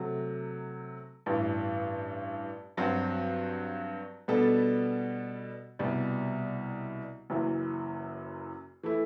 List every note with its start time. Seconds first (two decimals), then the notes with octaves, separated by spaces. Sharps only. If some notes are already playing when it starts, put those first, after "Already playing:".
Already playing: C3 F#3 A3
1.26 A1 G2 E3
2.77 G2 F#3 C4 F#4
4.28 B2 G3 B3 D4 A4
5.79 C2 B2 G3
7.30 F#1 F#2 E3
8.83 E3 A3 E4